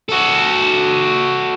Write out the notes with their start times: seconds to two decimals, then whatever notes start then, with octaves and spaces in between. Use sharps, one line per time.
0.09 F#4 A4